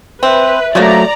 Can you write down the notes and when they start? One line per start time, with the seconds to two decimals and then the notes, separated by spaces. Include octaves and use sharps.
0.23 C4 B4 E5
0.75 C#3 F3 F#3 A3 A#3 D5 A#5